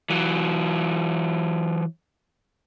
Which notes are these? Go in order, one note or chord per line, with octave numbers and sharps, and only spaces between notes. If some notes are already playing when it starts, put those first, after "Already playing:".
E3 F#3